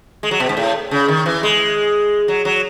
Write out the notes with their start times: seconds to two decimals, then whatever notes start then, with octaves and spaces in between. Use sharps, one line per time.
0.23 G#3
0.31 F#3
0.40 B2
0.49 G#2
0.57 A2
0.91 C#3
1.08 D#3
1.26 E3
1.43 G#3
2.28 F#3
2.45 F#3